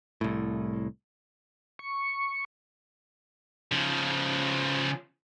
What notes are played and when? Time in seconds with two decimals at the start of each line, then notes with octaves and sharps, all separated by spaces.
0.21 C2 A2
1.79 C#6
3.72 C#3 F3